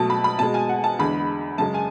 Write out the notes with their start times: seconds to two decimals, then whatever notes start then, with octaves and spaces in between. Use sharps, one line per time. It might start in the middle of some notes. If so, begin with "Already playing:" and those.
Already playing: B2 F#3 A3 A5
0.10 B5
0.24 B5
0.39 B2 G#3 A5
0.54 G#5
0.69 F#5
0.84 A5
0.99 E2 D3 G#3 B5
1.58 F#2 C#3 G#3 A5
1.74 G#5